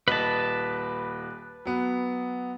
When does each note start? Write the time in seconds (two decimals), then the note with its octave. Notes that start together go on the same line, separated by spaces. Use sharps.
0.08 D#1 B4 D#5 A5
1.65 F#3 B3